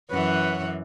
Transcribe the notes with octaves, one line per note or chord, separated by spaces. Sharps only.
F#2 E3 B4 C#5 F#5